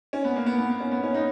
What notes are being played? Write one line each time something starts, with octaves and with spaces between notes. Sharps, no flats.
C#4
B3
A#3
B3
B3
B3
C#4
B3
C#4
D#4